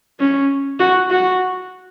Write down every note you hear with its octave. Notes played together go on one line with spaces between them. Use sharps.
C#4
F#4
F#4